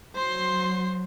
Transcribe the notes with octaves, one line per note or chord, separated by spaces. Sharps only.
F#3 C5 C6